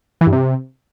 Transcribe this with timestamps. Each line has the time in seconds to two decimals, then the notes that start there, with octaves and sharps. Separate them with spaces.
0.21 E3
0.27 G2
0.33 C3